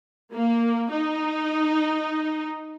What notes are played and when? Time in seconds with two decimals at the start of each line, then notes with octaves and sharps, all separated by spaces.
0.33 A#3
0.91 D#4